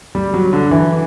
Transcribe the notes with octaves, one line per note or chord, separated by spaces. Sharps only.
G3
F#3
D3
E3